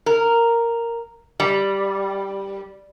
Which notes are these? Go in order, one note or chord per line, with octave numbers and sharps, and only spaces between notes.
A#4
G3